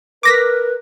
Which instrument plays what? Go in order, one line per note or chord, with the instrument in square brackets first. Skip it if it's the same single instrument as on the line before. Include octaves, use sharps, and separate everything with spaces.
[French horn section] A#4 [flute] B4 [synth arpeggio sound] D6 A#6 B6